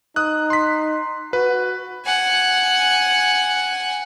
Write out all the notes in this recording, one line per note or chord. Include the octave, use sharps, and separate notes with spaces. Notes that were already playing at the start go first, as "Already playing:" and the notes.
D#4 D#6 F#6
C6 B6
F#4 B4
F#5 G#5